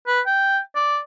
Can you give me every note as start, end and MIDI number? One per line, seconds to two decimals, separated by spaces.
0.07 0.21 71
0.27 0.59 79
0.76 0.99 74